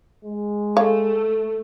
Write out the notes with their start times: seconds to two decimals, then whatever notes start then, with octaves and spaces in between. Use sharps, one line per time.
0.24 G#3
0.77 A3 C#5 F5